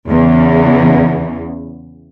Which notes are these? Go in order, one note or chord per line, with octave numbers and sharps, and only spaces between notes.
E2 C#3 E3